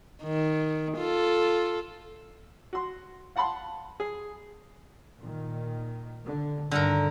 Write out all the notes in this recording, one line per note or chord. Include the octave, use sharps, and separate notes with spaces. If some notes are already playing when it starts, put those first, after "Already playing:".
D#3
F4 A4
F#4 C6
F5 F#5 A5 B5 C6
G#4
A#2 D#3
D3
G2 D3 D#3 A4 A#4